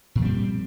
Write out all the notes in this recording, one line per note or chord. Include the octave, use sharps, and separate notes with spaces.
A#2 F3 G3 C4